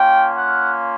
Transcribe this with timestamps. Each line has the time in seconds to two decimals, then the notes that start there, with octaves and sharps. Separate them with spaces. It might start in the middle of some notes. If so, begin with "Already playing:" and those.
Already playing: A#3 C#4 F4 G5
0.37 F#5